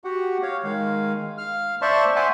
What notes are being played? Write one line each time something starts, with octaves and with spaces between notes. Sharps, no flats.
F#4 G4 F#5
C#5 F5
D#3 G#3 F5
F5 F6
C5 D5 E5 A5 C6 C#6
E5 F#5 G#5 A5 C6 D6